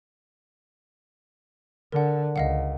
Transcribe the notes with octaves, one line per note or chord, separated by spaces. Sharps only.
D3 A#4 F#5
C#2 D#5 F5 F#5